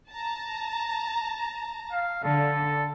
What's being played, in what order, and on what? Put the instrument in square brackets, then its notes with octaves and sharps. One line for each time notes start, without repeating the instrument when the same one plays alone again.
[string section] A5 A#5
[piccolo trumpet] F5
[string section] D3 [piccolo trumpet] A4